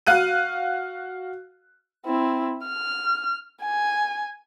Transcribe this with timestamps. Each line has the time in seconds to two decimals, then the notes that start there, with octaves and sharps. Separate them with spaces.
0.07 F#4 F5 F#6 D#7
2.06 C4 E4
2.67 F6
3.63 G#5